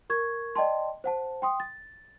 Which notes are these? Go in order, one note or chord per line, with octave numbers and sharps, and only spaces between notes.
A#4 C#6 G#6
D5 D#5 G5 A5 C6
C5 F#5 A5
G5 C6 D#6
A6